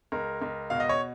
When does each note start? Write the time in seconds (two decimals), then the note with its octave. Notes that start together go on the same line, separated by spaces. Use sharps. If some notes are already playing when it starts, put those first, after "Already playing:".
0.12 C#2 A#4
0.42 C#2
0.70 B2 F5
0.80 D#5
0.89 C#5